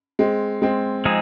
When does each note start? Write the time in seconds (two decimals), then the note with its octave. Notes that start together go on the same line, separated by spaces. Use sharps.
0.19 G#3 C4
0.62 G#3 C4
1.05 F3 G#3 C4 D#4 G#4